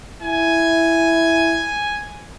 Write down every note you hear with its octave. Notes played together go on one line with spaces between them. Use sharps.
E4 G#5